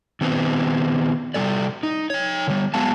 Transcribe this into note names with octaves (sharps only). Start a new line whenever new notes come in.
D#3 B3 C4
C3 F3 G3 A4 D5
D#4
D#4 C#5
D3 G3
F#3 G#3 B3 F5 A5